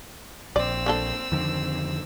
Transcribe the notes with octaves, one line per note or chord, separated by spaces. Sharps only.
A#1 C4 D5 E6
A#3 D4 A4
F2 D3 D#3